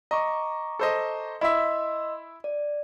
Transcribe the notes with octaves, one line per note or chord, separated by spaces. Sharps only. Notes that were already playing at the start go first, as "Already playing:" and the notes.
D#5 A#5 C#6 D6
A4 C5 D#5
E4 D#5 E5 C6 E6
D5